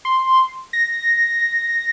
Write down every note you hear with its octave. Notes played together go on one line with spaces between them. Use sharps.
C6
A#6